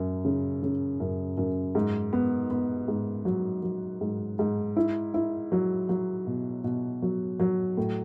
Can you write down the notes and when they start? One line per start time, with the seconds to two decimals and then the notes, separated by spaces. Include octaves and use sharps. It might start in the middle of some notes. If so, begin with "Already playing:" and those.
Already playing: F#2
0.25 C#3
0.62 C#3
1.00 F#2
1.37 F#2
1.75 G#2
2.13 B3
2.51 B3
2.88 G#2
3.25 F#3
3.63 F#3
4.01 G#2
4.39 G#2
4.77 E4
5.14 E4
5.52 F#3
5.89 F#3
6.27 B2
6.64 B2
7.02 F#3
7.40 F#3
7.77 A2